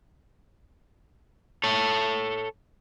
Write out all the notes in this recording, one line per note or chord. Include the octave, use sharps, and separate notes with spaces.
A4 C#5